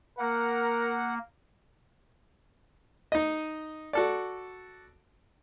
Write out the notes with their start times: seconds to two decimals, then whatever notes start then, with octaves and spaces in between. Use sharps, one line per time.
0.19 A#3 A#4 F#5
3.12 D#4 D#5
3.93 F#4 A4 D5